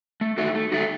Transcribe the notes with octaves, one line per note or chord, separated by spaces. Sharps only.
A3
D#4 F#4 A4 E5
A3
D#4 F#4 A4 E5